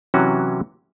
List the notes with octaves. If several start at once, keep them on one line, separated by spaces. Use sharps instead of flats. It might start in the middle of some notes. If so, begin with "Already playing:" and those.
C3 E3 F#3 C#4 F#4